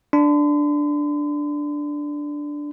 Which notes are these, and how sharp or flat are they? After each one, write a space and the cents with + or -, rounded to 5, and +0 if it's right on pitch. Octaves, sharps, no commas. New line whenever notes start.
D4 +0 C6 -45